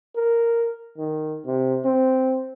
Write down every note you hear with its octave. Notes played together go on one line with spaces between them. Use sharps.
A#4
D#3
C3
C4